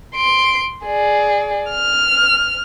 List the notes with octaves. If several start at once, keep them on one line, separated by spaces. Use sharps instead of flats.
C6 D7
G#4 D5
F6